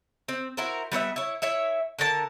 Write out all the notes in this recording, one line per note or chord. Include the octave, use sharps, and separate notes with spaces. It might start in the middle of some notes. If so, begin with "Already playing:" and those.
C4
E4 F#4 A#4 C5
G3 B3 C5 E5
E4 C#5
E4 C#5 E5
D3 A#4 C5 A5